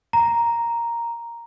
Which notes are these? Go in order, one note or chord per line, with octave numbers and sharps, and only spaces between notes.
A#5